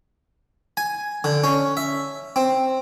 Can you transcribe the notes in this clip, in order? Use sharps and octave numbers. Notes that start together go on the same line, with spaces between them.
G#5
D3
C#4
E5
C4